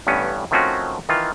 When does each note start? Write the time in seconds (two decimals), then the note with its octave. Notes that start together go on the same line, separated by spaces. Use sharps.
0.07 A1 G2 B3 C#4
0.51 D#3 F3 A3 C4 C#4 F#4
1.09 D#3 E3 F4